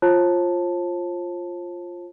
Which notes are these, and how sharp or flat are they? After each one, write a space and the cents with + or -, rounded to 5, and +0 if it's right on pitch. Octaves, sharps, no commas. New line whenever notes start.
F4 +0 C5 +45 A5 +0